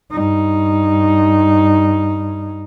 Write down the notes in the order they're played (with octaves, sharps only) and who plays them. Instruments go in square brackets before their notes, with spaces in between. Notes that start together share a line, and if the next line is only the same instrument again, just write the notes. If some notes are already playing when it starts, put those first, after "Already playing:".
[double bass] G2 D#4